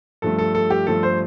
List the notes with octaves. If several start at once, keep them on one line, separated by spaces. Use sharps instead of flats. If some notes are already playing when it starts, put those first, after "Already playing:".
G2 F3 A3 A4
A4
A4
G4
G2 F3 A3 A4
C5